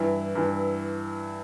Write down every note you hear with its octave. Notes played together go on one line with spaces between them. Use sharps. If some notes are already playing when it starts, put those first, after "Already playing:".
Already playing: G2 E3 E4
G2 E3